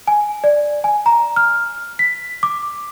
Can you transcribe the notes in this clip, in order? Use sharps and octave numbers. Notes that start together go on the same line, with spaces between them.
G#5
D5
G#5
A#5
F6
B6
D6